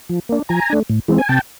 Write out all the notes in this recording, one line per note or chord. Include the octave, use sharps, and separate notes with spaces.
F3
A#3 D4
F3 G#5 A#5
A3 D4
A2
E3 G#3 C4
G#5
C3 G5 A5